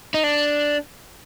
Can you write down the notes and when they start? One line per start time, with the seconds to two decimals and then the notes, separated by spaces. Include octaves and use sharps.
0.14 D#4
0.23 D4